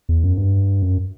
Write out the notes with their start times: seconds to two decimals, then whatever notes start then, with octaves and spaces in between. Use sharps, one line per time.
0.09 E2
0.24 F#2
0.38 G2
0.82 F#2